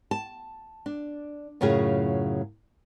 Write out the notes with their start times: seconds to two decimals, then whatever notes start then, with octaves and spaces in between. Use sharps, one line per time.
0.11 A5
0.86 D4
1.61 F#2 A2 C#3 F#3 F4 G#4